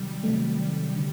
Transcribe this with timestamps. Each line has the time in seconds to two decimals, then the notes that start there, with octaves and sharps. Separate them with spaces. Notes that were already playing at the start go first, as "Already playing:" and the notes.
Already playing: C3 D#3 F#3 G3
0.23 C3 D#3 F#3 A3
0.96 D3